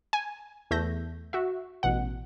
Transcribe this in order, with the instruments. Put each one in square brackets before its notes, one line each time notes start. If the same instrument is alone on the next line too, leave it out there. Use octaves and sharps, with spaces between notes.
[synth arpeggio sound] G#5
E2 A3 E5 G6 A#6
F#4 E5
A1 B2 F#5